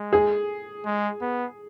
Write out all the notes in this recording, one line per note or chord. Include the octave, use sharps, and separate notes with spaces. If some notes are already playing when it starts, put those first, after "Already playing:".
Already playing: G#3
G#4
G#3
B3